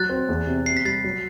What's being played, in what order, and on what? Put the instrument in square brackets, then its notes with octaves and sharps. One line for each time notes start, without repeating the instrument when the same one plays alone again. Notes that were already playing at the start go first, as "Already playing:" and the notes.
Already playing: [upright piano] F#3 [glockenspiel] F#6 A6
[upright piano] C4
E2
C3
[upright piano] C3 [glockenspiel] C7
[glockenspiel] B6
[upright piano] G3 [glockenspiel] A6 C7
[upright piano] F#3